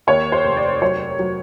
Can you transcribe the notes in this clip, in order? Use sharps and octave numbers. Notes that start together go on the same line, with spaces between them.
D#2 C#5
C5
F1
D5
F#3 C#5
F#3